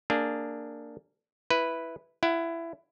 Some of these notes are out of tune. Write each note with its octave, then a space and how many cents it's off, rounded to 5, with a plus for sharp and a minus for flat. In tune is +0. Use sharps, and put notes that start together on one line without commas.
A#3 -20 D4 +0 G#4 +0
E4 +0 B4 +0
E4 +20 F#5 +0